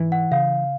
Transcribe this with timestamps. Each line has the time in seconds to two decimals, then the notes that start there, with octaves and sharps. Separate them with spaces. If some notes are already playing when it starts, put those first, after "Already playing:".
Already playing: G#2 E3
0.12 F#5
0.31 C#3 F5